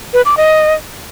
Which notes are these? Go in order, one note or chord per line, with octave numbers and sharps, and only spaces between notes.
B4
D6
D#5